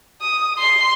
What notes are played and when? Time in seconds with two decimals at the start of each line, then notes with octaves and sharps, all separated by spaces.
0.21 D#6
0.59 C6